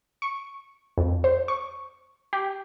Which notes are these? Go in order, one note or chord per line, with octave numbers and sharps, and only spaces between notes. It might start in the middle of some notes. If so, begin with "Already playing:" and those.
C#6
F2
C5
C#6
G4